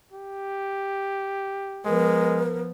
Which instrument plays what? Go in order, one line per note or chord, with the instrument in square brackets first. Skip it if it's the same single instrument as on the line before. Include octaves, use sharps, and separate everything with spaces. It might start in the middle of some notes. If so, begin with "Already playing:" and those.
[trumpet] G4
[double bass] F3 B3 [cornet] G#3 [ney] A#4